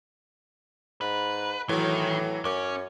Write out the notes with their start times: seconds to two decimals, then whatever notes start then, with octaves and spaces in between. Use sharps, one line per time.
1.01 G#2 B4
1.69 A2 D#3 E3 F#3
2.45 F#2 C#4 D6